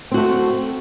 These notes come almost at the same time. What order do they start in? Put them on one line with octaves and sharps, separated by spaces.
C4 F#4 A3